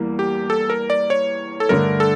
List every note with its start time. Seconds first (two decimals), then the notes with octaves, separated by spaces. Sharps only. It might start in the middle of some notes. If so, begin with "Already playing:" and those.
Already playing: E2 E3 G3 A#3
0.19 G4
0.50 A4
0.70 A#4
0.90 D5
1.10 C#5
1.60 A4
1.69 G2 D3 A3 D4 A#4
2.00 A4